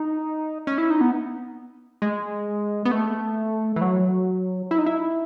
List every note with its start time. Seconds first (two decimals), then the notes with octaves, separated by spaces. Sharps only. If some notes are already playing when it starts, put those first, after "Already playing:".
Already playing: D#4
0.67 C#4
0.78 E4
0.90 D#4
1.01 B3
2.02 G#3
2.85 B3
2.91 A3
3.76 E3
3.81 F#3
4.71 E4
4.78 D#4
4.86 E4